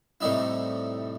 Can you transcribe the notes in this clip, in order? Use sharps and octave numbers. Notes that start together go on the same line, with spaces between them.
A2 C3 G3 D#4 E4